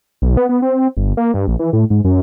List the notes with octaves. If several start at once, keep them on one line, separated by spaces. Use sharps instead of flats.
B1
B3
B3
C4
G1
A#3
G2
A#1
E3
A2
G#2
F#2